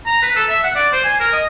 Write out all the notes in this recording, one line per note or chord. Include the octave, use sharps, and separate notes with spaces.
A#5
B4
A4
E5
F#5
D5
C5
G#5
A#4
D#5